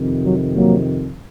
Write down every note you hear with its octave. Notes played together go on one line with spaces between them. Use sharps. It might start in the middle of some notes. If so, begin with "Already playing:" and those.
Already playing: F2 C3 D#3
F#3
F#3 A#3